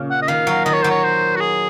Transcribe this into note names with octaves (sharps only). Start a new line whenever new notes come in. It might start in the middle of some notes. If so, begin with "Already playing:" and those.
Already playing: A#2 C#3
F#5
D#5
D#3 F5
F#3
D#3 D#5
C#5
F#3 C5
C#5
C5
F#4
G#4